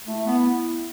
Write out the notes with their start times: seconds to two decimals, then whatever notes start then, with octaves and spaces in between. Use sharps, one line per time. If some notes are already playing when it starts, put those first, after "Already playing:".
0.08 A3 E4
0.27 B3